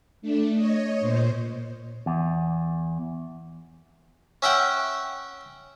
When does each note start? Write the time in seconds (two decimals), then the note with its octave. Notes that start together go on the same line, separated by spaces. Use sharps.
0.22 A3 D4
0.54 C#5 D#5
1.00 A#2 C5
2.06 E2
4.42 C#4 E5 F#5 G5